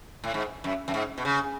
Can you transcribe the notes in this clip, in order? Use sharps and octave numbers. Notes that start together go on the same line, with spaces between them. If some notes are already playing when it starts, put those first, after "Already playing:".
A2
G#2
F#2
F#2
G#2
B2
C#3